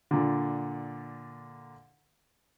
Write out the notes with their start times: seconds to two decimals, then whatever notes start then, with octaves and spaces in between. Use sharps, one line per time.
0.11 A#2 D3